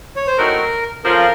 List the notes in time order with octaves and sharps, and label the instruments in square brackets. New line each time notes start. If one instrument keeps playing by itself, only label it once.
[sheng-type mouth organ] C#5
C5
[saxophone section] A2 F#3 C4 D#4 F#4 [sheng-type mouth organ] A#4
[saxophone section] F2 C#3 F3 [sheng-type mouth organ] A#4